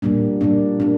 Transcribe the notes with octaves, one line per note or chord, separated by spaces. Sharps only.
A#2 G3 A#3 D4
A#2 G3 A#3 D4
A#3 D4